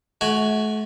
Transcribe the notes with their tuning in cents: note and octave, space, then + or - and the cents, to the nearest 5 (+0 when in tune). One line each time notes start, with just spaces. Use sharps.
A3 -40 F#4 +0 G#5 +0